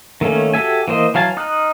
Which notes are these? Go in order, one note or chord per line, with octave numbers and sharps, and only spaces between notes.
D#3 A3 A#3 C#4
F#4 G4 A4 E5 G#5
E3 A#3 C5 D#5
E3 F#3 F5 G#5 A5
D#4 D#6 F6 F#6